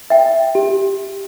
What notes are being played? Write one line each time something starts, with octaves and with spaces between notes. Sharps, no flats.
E5 G5
G4